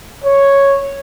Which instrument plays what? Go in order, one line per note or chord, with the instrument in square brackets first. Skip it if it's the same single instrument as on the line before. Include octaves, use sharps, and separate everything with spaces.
[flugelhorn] C#5